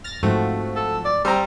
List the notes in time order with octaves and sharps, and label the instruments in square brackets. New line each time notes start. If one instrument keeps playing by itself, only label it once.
[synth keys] F6 A6 A#6
[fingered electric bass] G#2 [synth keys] F3 C4 F#4 [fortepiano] A3
[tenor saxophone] A4
D5
[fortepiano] G3 G4 A#5 [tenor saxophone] C4